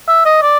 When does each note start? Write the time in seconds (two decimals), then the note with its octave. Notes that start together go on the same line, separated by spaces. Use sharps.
0.08 E5
0.26 D#5
0.43 D5